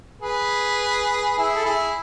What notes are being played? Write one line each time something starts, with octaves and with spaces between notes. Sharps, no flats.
G#4 B4
E4 G#4
A4
E4 G#4